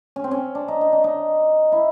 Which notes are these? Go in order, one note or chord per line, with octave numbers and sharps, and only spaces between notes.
C#4
C4
C#4
D4
D#4
D#4
D4
D#4
E4